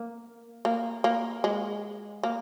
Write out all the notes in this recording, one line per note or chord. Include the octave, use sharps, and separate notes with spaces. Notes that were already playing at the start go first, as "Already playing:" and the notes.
Already playing: A#3
A#3
A#3
G#3
A#3